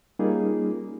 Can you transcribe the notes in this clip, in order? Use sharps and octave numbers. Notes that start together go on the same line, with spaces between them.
G3 A#3 C#4 D#4 F4 G#4